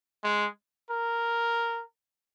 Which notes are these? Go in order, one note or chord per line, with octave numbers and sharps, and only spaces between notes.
G#3
A#4